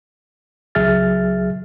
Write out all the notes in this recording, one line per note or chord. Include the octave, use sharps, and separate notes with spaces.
C#2 F#3 G#4 E5 F6 A6